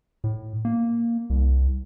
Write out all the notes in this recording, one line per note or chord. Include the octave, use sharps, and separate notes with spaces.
A2
A#3
C2